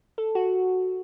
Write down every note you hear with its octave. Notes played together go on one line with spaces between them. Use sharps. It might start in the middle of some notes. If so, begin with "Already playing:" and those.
A4
F#4